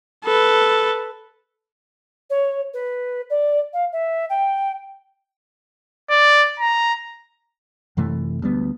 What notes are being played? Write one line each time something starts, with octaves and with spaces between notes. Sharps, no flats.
A4 B4
C#5
B4
D5
F5
E5
G5
D5
A#5
F#2 C3 E3 A3
D2 G3 B3